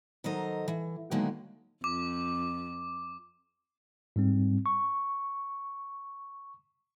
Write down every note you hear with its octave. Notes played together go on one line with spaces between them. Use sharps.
D#3 F#3 A4 C5 D#5 A#5
E3
D3 D#3 F#3 G#3 A#3 B3
F2 D6
G#2 G3 C4
C#6